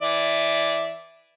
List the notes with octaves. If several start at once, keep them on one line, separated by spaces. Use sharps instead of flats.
E3 D5 E5